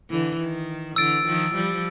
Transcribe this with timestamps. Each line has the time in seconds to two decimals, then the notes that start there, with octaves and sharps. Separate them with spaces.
0.10 D3 E3
0.39 D#3
0.96 D3 E3 E6 A6 D7
1.25 D#3 F3
1.55 F3 G3